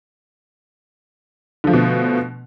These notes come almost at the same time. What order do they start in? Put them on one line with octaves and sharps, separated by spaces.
D3 F3 A3 B2